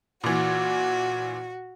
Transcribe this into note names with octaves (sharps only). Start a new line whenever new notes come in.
A#2 E3 F#4